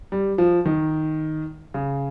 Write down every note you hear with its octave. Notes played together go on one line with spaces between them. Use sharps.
G3
F3
D#3
C#3